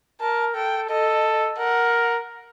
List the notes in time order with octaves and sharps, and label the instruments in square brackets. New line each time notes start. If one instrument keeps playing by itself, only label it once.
[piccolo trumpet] A#4 [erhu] A5
[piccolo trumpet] A4 [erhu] G5
[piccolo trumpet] A4 [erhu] D#5
[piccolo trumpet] A#4 [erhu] F#5